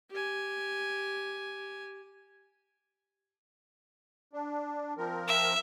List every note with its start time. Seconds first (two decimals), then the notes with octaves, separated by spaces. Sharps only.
0.11 G4 G#5
4.33 D4
4.98 F3 C4 A#4
5.28 E5